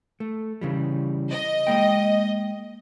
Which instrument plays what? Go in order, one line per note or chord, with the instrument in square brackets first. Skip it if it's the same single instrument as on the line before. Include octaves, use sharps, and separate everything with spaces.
[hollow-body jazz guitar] A3
C#3 E3 G3
[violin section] D#5
[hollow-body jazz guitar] G#3 A#3 G5